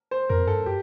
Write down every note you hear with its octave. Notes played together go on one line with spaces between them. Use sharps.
C5
F2 A#4
G2 A4
G4